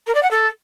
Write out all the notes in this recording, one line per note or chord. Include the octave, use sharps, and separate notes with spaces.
A#4
D5
F#5
A4